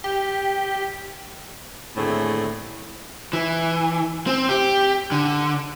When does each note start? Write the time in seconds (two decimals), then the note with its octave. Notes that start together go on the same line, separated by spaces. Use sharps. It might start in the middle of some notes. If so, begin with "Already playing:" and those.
0.04 G4
1.97 D#2 A2 D3 A3 C4 G#4
3.33 E3
4.27 C4
4.49 G4
5.12 D3